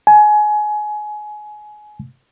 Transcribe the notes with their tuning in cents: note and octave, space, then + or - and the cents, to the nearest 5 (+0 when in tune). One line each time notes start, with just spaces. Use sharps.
G#5 +25